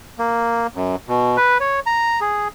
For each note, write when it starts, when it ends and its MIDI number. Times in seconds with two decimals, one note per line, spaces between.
0.19 0.67 58
0.75 0.96 42
1.08 1.37 47
1.37 1.58 71
1.60 1.80 73
1.86 2.20 82
2.21 2.48 68